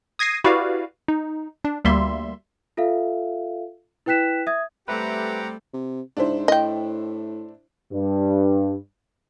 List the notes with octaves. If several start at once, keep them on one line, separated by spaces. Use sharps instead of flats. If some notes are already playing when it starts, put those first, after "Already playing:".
D#6 G#6 A#6 C7 D#7
E4 F#4 G4 B4 D5 F5
D#4
D4
D2 G3 A#3 E5 C6
F4 A4 E5 F5
E4 B4 G5 F#6 B6 E7
E5 D#6 G#6
G3 A3 C4 G4 B4 E5 F#5 A#5
C3
G#2 D4 E4 C5
A2 D#5 G5
G2